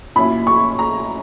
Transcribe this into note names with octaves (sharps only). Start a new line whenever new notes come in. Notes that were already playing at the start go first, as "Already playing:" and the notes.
A#2 F#3 C#4 E4 B5
C#6
A#5